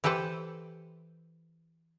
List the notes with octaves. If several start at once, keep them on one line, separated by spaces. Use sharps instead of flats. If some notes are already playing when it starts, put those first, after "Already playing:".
E3 G4 A4 B4 C5